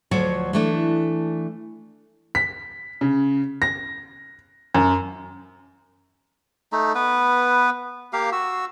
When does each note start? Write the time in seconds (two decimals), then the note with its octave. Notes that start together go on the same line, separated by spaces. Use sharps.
0.11 D2 F3 F#3 C#5 D5
0.53 E3 A3 D4
2.35 B6
3.01 C#3
3.62 A#6
4.74 F#2
6.72 A3 D#4
6.95 B3 B4
8.13 A#3 G4 F5
8.32 F#4 E6